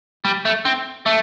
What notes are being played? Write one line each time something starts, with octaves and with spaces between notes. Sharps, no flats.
G3
A3
C4
A3